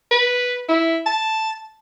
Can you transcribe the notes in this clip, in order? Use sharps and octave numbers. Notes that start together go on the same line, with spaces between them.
B4
E4
A5